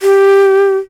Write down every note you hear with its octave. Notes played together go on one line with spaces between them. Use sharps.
G4